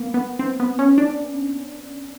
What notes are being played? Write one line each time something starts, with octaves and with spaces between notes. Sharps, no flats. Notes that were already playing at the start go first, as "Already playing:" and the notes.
Already playing: A#3 B3
B3
C4
B3
C#4
D4